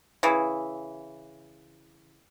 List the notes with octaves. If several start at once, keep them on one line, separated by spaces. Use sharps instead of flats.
C#3 E3